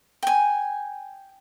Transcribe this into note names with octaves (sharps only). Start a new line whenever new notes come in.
G5 G#5